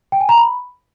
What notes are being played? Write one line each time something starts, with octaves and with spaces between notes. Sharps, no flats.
G5
G#5
A#5
B5